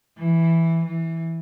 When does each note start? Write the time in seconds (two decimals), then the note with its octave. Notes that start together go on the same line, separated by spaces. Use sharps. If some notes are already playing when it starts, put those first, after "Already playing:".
0.18 E3
0.85 E3